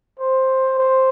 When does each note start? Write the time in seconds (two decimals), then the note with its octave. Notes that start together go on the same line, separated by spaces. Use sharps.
0.19 C5
0.78 C5